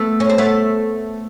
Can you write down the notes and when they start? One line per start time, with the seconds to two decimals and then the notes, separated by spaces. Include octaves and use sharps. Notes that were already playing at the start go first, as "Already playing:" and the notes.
Already playing: A3 B3
0.20 C#4
0.29 C4
0.38 A3 B3